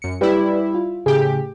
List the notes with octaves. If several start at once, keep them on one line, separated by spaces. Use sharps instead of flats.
F#2 C#7
G3 E4 G4 B4 D5
F4
A2 C#3 G4 G#4